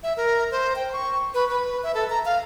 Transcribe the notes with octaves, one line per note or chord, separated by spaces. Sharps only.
E5
A#4
C5
G5
C#6
B4
B4
E5
A4
A#5
F5